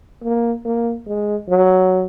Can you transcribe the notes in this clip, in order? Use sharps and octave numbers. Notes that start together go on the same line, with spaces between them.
A#3
A#3
G#3
F#3